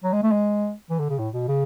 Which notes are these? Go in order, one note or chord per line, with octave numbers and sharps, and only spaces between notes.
F#3
G#3
A3
G#3
E3
D3
C#3
A2
B2
C#3